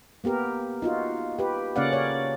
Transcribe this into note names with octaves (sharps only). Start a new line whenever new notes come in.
A#3 B3 G4 A#4
D#4 F4 F#4
G4 B4
C#3 A#3 C#4 D5 F5 F#5
C#5 D5